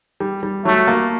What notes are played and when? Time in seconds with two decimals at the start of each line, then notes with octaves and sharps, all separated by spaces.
0.20 G3
0.43 G3
0.65 F#3 A3
0.87 A#3